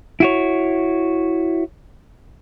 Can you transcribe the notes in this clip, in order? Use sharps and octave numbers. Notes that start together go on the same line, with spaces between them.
E4 F#4 C#5